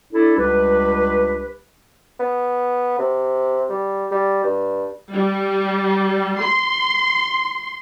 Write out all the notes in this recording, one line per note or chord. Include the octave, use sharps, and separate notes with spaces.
D4 E4 A4
C#2 G3 D4 G4 B4
B3
C3
G3
G3
G2
G3
C6